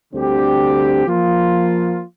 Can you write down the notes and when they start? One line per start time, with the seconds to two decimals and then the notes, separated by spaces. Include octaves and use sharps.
0.12 D2 D3 G3 C4 G4
1.07 F3 A#3 F4